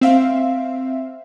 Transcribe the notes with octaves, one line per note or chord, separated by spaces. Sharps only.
C4 E5 F5